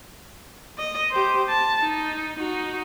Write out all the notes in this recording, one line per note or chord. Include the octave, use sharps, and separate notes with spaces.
D#5
G4 C5
A5
D#4
D#4 F#4